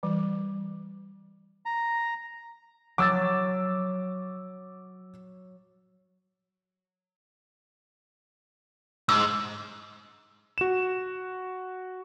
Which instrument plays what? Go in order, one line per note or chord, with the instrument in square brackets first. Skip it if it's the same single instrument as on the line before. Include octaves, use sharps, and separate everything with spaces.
[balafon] E3 G3
[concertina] A#5
[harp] F#3 [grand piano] D6 E6 A6
[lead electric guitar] G#2 [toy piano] E6
[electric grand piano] F#4 E7